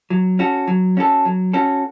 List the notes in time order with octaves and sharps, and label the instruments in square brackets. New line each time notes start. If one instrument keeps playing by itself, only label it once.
[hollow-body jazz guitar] F#3
C#4 F#4 A4
F#3
C#4 F#4 A4
F#3
C#4 F#4 A4